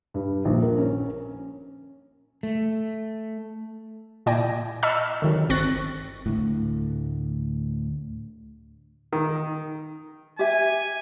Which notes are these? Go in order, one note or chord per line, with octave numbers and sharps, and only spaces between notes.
G2
A#1
A#4
C#4
A3
A#2 E4 D5 G5 G#5 A#6
D#5 A5 B5 C#6 E6 F6
D3 D#3 F#3
G1 C4 C#6 F#6 A6 A#6
D2 A2
D#3
G4 E5 G#5